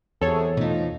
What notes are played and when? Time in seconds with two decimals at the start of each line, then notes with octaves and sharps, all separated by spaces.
0.21 E2 C3 F#3 G#4 A4 C#5
0.57 B2 F3 A3 D#4